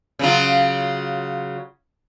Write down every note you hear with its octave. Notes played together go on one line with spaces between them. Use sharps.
C#3 F#3 F4